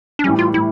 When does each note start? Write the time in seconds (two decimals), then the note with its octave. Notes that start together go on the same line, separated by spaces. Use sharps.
0.19 D4
0.24 A2 E3 G3 C#4
0.39 F4
0.54 A2 E4